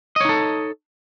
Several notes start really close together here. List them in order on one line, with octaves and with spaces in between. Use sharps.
D#5 C#5 D#4 A4